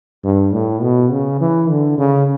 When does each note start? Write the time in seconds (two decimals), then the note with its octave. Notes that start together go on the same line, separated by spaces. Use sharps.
0.24 G2
0.52 A2
0.82 B2
1.11 C#3
1.40 E3
1.69 D3
1.98 C#3